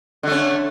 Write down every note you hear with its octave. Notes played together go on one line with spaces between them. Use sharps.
D3 A3 C#4